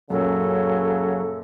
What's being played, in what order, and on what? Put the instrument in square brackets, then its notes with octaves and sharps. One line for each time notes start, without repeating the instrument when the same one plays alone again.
[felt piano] F#2 A#2 C#4 [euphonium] C#3 [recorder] F#3 [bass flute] A4